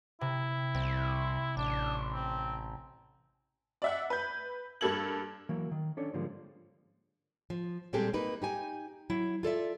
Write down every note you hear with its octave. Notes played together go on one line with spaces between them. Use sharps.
C3 E4
C2 C4
A1 D4
C4
D5 E5 F#5
B4 G6
G2 A#3 A4 G#6 F#7
E3 F#3 A#3
D#3
C#4 D4 A4 C#5 D5
G#2 D3 F3 G3 G#3 A#3
F3
A#2 G3 G#3 C4 G4 A4
A#3 D#4 B4
D#4 G4 G#5
F#3 E4
F4 A4 D5 E5